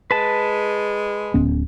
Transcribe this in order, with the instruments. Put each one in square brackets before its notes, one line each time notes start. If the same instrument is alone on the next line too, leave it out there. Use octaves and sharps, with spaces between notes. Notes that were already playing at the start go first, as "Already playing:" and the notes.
[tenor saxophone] G#3 [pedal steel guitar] B4 A5
[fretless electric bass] D1 B3 C#4